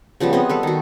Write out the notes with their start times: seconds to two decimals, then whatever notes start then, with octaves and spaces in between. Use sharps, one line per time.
0.20 C#3 F3 G3 B3
0.33 B3 C4 G#4 D#5
0.49 G3 A4 B4
0.63 D#3 F#4